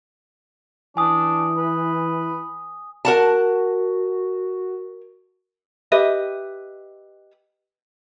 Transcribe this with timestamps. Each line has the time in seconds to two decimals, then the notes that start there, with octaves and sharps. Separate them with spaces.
0.97 E3 D4 G#5 D#6
1.58 B4
3.05 F#4 A#4 F#5 A5
5.92 G4 B4 D#5 E5